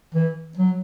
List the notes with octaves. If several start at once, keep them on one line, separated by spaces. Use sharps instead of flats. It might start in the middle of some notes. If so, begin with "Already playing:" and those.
E3
F#3